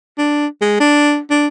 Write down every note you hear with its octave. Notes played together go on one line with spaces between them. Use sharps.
D4
G#3
D4
D4